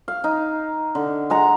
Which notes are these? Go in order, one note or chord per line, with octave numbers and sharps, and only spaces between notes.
F5
D#4
D3
G#3 F#5 A#5